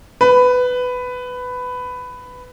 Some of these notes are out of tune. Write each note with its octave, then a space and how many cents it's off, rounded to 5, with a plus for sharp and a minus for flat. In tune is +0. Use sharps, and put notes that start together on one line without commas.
B4 +15